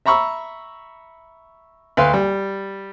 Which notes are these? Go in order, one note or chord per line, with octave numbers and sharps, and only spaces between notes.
E5 A#5 B5 C#6 E6
D2 B4 F5 C6
G3